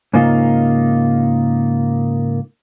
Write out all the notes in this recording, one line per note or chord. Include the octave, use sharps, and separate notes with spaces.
G#2 C#3 A#3 D#4 F4